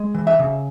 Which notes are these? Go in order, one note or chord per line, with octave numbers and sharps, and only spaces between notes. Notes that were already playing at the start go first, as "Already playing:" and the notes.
Already playing: G#3
E3
E5
C#3